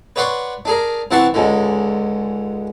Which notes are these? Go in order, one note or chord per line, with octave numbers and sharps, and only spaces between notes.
B4 C#5 D5 F#5 C6 C#6
D4 G#4 A#4
C3 E3 F#5 A5 C6 C#6
C#2 G#2 D3